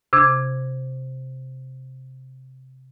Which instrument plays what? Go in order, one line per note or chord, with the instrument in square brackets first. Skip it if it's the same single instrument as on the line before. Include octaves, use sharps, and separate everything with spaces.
[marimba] C3 D4 D6 G#6